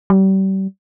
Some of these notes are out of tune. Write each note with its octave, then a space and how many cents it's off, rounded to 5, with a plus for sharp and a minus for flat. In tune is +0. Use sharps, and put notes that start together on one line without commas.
G3 -35